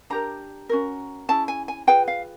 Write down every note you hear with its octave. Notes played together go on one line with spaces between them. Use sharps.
D4 G4 A#4 A#5
C#4 F#4 A#4
C#4 E4 G#4 A5
G#5
G#5
F4 G#4 B4 G5
F5